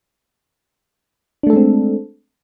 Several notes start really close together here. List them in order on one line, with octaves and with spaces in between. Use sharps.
D4 A3 A4 G#3 C4